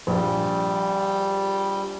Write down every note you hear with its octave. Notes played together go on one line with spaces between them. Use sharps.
A#1 G3